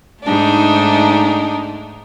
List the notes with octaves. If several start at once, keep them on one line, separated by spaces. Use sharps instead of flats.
G#2 A3 D4 D#4